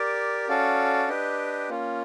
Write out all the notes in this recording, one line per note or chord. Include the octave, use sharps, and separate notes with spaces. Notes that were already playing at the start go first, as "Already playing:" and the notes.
Already playing: G4 A#4 D5
C#4 F#4 A4 D5 F5
D4 G4 B4 D#5 G5
A#3 C#4 F4